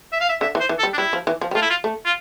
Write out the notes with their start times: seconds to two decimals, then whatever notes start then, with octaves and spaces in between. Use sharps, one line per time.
0.13 E5
0.21 F5
0.29 E5
0.41 D3 E5
0.55 E3
0.60 C5
0.69 E3
0.79 A4
0.83 G3
0.93 D4
0.98 G3 E4
1.13 F3
1.27 E3
1.41 F3
1.51 G3
1.55 A3 F4
1.62 E4
1.70 F4
1.84 A3
2.06 F4